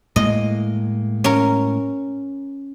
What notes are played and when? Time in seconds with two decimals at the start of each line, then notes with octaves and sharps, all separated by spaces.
0.16 A2 G#3 A#3 D#5
1.24 C#4 A#4